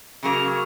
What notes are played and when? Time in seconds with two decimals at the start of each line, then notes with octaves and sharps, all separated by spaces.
0.23 C#3 F#3 A#3